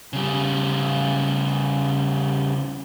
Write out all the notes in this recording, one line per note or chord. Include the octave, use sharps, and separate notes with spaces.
C#3 G3